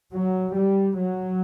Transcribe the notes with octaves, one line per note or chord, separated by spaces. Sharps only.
F#3
G3
F#3